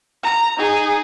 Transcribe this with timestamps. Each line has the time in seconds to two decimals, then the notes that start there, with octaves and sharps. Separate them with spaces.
0.23 A#5
0.58 D#4 G#4